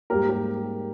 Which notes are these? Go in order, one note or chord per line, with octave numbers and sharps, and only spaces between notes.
G#2 G3 A#3 G4 A#4
G4 A#4